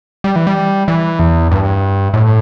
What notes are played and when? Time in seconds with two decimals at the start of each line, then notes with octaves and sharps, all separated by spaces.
0.24 G3
0.36 E3
0.47 G3
0.88 E3
1.19 E2
1.51 G2
2.14 A2